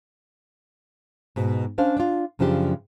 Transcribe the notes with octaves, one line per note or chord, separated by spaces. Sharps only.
G#2 B2
C#4 D4 C5 F5
D4 F4
F#2 C#3 F3 D4 G4